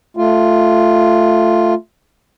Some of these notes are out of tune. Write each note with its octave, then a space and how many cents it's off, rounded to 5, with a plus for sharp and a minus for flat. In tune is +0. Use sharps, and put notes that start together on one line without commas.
A3 +0 F4 +0